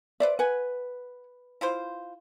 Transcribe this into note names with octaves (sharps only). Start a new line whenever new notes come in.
B4 C5 D5 E5
B4 F#5 G#5
E4 F4 C5